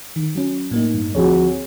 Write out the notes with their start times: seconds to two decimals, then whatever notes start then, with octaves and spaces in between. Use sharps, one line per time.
0.16 D#3
0.35 F#3 C#4
0.71 A2 A#3 D#4
0.94 G2
1.15 D2 F3 C4 F#4 G#4 C#5